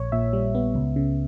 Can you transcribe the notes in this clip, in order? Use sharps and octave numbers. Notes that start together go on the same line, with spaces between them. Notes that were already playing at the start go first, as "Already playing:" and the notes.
Already playing: A#1 C#5
A#2 E5
G3
B3
C#2
C#3